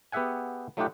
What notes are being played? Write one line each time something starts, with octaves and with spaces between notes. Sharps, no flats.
B3 G4 G#4 E5 F#5 G#5
F#3 A3 D#4 F4 G4 F#5